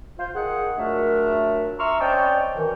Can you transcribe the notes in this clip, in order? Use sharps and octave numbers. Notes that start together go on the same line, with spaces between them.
F4 C5
D#3 G#4 F#5
A#2 F#3 A3 D4 A#4 E5
E5 A#5 C6 C#6 E6 F6
C4 C#4 D5 D#5 G5 A5
F#2 D#3 E3